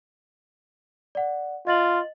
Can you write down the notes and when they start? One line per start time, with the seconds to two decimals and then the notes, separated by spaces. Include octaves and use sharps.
1.15 D5 F#5
1.67 F4 D#5 A6 F#7